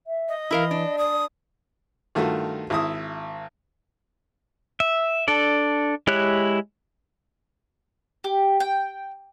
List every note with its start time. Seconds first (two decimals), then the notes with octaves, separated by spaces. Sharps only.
0.07 E5
0.29 D#5
0.51 E3 E4 A#4 F5
0.71 D4
0.98 D5 D#6
2.15 G2 D#3 A3 F4 F#4
2.70 G#1 E4 D#6
4.80 E5
5.28 D4 A4 D5
6.07 G#3 E4 G4 C#5 F#6
8.24 G4
8.60 G5